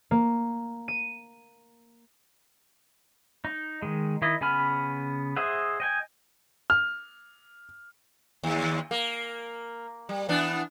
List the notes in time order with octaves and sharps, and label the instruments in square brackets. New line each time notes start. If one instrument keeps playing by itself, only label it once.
[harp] A#3
D#7
[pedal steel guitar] D#4
D#3 G#3
D#3 E4 D#5
C#3 B3 G#5 B5 F6
G#4 C5 D#5 E5 F#5
D#5 G5 G#5
[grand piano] F6
[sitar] D#2
A#3
G3
E3 B3 D4